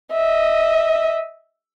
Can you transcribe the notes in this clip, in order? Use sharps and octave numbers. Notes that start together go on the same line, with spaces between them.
D#5 E5